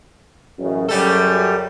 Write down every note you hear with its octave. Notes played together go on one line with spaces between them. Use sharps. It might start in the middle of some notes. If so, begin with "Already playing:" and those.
A1 F#2 C#3
F#2 C#3 G3 A4